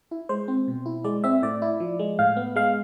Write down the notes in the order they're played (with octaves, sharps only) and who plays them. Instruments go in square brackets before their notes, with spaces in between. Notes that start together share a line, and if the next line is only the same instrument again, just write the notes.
[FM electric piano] E4
G#3 C5
C4
B2
E4
G#3 D5
C4 E5
A2 D5
E4
F3
G#3
A2 F5
B3
G#3 F5